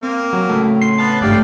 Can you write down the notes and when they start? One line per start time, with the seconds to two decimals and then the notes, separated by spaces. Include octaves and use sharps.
0.03 A#3 C4
0.33 F#3
0.49 A2 C#3 A3
0.81 C6 C7
0.98 B3 B4 A5 F6
1.21 G#1 G2 E3 A3 D5 F5 G5